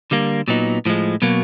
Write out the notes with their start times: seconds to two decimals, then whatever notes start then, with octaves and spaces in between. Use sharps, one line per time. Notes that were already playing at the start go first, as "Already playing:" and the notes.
0.11 D3 G3 A#3
0.48 A#2 F#3 B3 D#4
0.86 A2 F3 G#3
1.22 B2 F#3 A#3